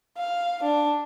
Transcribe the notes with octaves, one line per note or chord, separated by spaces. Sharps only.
F5
D4